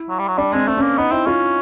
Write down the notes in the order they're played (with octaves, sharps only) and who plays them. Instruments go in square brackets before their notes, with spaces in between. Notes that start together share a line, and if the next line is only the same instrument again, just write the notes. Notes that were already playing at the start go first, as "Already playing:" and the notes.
Already playing: [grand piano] E4
[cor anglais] F#3
G3
F#3
[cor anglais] G3 [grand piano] D4
[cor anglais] G#3 [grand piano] C4
[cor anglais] A3 [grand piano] C4
[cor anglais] A#3 [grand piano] C#4
[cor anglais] B3 [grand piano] D#4
[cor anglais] C4 [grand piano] E4
[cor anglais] C#4 [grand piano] F4